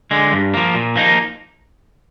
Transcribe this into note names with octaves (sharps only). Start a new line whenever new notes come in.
D3 G#3
G2
F3 A#3
A#2
F3 A#3 D#4